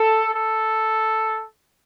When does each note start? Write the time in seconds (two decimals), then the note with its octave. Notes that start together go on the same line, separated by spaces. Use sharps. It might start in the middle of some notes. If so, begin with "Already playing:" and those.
Already playing: A4
0.33 A4